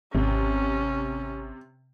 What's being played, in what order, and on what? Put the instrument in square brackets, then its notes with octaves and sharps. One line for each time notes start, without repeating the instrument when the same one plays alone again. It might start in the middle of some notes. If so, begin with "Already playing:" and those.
[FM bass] G#1 [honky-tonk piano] C3 [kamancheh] C#4